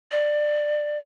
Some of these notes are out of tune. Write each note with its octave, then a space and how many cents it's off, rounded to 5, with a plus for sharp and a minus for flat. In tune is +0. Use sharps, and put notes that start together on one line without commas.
D5 +20